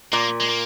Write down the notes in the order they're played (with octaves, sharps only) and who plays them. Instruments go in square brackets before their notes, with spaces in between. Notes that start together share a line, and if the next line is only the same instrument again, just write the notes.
[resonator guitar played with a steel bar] A#2 [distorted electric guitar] A#3
[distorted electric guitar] G#3
A#3